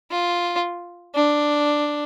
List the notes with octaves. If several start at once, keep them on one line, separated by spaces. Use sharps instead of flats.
F4
D4